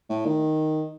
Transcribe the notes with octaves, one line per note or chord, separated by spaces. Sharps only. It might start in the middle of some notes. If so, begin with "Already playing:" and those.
A2
D#3